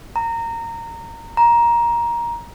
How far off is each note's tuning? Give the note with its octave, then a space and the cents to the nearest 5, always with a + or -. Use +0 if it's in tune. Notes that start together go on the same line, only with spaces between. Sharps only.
A#5 -20
A#5 +15